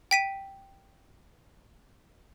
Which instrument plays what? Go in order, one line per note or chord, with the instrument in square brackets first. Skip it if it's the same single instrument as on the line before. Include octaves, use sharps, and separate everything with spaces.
[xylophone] G5 B6 D#7